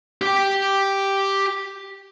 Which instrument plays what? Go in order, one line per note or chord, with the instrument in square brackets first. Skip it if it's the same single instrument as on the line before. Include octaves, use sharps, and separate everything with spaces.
[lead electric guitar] G4 G5